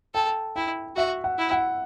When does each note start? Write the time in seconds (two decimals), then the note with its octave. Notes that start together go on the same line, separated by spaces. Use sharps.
0.15 A4 G5
0.56 E4 G5
0.96 F#4 E5
1.24 F#5
1.38 E4
1.51 F#5